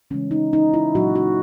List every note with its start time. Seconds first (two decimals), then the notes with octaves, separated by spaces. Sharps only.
0.11 C#3 E3 G#3 C#4
0.31 D#4
0.53 D#4
0.74 E4
0.95 A#2 F#3 A#3 F#4
1.15 F#4